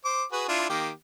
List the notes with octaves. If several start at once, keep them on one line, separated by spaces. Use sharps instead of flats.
C5 D6
F#4 G#4 B4
D4 E4 F4
D#3 A#3 G4